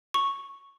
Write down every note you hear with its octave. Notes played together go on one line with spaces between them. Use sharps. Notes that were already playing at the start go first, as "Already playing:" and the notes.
C#6